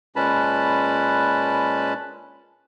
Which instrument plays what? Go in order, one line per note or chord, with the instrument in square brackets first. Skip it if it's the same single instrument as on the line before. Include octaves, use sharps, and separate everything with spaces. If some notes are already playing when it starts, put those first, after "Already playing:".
[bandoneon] A#2 G#3 C#4 B4 A5 B5